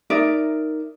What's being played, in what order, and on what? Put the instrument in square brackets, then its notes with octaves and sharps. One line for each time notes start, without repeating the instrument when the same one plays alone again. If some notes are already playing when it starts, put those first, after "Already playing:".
[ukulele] D#4 A#4 D5 E5